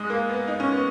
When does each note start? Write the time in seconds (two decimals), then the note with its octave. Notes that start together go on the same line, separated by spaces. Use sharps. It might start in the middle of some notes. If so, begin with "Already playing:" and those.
Already playing: G#2 G#3
0.10 A#3
0.29 B3
0.48 D#4
0.60 C#4
0.72 B3